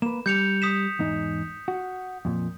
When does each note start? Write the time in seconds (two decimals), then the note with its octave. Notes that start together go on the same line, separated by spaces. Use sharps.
0.02 A#3 B4 E7
0.26 G3 G6 C#7 F7
0.62 D#6 B6 E7
0.99 E2 G#2 D#4
1.68 F#4
2.25 F2 A#2